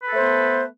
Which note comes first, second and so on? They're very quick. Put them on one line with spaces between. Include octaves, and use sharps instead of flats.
B4 A4 A3 C5 B3